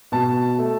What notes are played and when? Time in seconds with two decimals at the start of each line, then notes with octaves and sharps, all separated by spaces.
0.12 B2 A5
0.58 A3